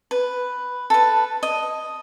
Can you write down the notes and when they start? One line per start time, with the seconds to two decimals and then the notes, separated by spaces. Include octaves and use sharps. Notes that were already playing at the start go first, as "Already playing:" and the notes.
0.11 B4
0.90 A4 B4
1.43 D#5